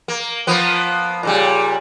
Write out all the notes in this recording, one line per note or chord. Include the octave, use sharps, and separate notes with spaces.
A#3
F3 A#3 B3
A#2 C#3 G3